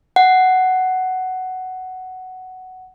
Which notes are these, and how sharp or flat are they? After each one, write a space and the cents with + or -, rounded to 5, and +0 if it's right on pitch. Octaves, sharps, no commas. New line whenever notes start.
F#5 +10